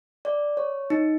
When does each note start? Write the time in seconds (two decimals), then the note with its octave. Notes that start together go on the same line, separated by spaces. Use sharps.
0.25 D5
0.57 C#5
0.90 D#4